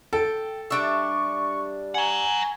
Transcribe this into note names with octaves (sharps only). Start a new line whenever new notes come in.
A4 G5
G3 D4 E5 C#6
F#5 G#5 A#5